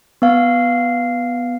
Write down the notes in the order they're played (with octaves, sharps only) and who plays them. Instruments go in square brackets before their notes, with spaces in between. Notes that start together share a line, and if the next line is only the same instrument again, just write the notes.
[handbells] B3 F5